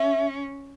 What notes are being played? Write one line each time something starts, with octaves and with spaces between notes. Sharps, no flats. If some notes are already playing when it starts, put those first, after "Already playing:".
Already playing: C#4 E5